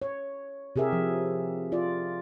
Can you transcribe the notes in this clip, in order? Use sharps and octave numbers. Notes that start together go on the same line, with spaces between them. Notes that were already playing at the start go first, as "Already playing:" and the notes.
C#5
C3 G4 G#4 A#4 E5
F3
F4 D5